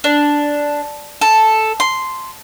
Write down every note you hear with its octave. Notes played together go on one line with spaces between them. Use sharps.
D4
A4
C6